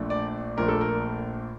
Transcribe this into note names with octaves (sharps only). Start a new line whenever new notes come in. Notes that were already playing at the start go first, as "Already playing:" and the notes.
Already playing: A#1 A#2 A3 D4
D5
A#1 A#2 A3 D4 A#4
A4
A#4